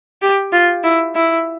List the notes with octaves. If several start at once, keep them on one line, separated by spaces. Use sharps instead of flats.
G4
F4
E4
E4